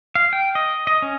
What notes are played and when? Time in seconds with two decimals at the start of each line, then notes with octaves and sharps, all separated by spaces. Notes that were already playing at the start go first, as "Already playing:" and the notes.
0.15 F5
0.33 G5
0.55 D#5
0.87 D#5
1.02 C#4